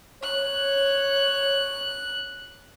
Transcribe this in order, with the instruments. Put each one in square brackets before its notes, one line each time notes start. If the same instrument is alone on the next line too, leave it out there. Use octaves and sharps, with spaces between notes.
[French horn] C#5 [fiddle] F#6